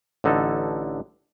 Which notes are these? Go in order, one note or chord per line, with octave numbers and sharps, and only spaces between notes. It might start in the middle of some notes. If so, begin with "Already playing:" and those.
A1 D3 D#4 A4